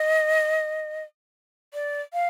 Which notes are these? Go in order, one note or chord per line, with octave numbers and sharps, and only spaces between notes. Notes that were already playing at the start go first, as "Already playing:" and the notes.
Already playing: D#5
D5
F5